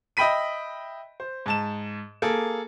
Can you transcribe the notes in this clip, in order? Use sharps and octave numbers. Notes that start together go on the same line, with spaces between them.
D#5 E5 G5 B5 B6 D#7
C5
G#2 A5 E7
A#3 G#4 A4